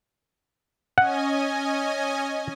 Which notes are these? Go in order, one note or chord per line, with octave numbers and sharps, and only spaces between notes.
C#4 D#5 F#5 G#5